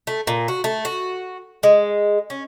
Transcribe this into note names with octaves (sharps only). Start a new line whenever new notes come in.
A3
A#2
F#4
A3
F#4
G#3
C#4